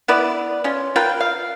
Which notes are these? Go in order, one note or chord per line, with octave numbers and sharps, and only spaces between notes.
B3 E4 B4 D5
C#4 F4
F4 A#4 B4 G5
F5